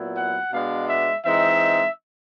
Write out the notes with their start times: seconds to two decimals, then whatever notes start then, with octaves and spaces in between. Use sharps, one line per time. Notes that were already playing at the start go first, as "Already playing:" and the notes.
Already playing: A#2 F#3 B3 E4
0.16 F#5
0.52 B2 G#3 B3 D4 F5
0.88 E5
1.25 E3 G#3 C4 D#4 E5